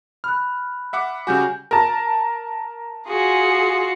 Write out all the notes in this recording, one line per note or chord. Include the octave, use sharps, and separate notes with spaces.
B5 F6 F#6
E5 F#5 D6
C#3 G3 F#4 G#5 G6
A#4 A5
F4 F#4 G#4